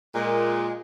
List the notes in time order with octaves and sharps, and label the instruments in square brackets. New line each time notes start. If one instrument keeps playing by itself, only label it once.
[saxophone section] A#2 G#3